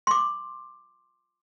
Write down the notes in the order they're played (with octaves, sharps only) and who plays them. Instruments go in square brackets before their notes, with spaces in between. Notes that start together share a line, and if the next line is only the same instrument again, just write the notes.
[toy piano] C6 D6